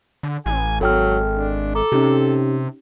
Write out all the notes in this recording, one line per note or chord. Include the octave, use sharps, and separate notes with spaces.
D3
A1 G#5
G#1 F#3 A4 G5 F6
D4
A4 A#5 D6
C3 C#4 D#4 G4